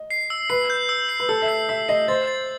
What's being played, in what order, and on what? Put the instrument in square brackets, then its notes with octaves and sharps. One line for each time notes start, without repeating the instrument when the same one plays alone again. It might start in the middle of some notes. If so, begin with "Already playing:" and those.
Already playing: [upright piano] D#5
[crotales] C7
E6
[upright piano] B4 [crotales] C7
[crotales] G6
E6
C7
[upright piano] B4
[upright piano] A4 [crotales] E6
[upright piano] E5
[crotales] C7
[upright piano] E5 [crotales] E6
[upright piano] D#5 [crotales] C7
[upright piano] C5 [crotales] A6
[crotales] A6